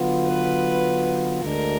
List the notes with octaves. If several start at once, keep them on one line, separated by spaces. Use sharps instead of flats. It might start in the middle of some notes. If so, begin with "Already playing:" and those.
Already playing: D3 F#3 B3 F4
B4
D2 D3 G#3 D4 A#4